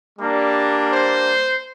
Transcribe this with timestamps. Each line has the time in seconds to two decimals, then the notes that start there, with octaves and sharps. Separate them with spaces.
0.19 G3 A#3 D4
0.91 C5